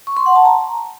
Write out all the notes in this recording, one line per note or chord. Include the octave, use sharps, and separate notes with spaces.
C#6
C6
F#5
A5
A#5